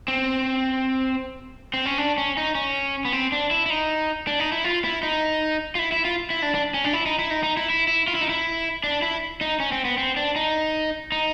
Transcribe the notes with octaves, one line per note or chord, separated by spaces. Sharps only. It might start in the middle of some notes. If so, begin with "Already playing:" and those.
C4
C4
C#4
D4
C#4
D#4
C#4
B3
C4
D4
E4
E4
D#4
D4
D#4
E4
F4
E4
D#4
F4
E4
E4
F4
E4
D4
D4
C#4
D4
E4
D#4
E4
D#4
D#4
E4
E4
E4
F4
E4
D#4
E4
D4
E4
D#4
C#4
C4
B3
C4
D4
D#4
D#4